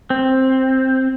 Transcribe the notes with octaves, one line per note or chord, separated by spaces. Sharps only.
C4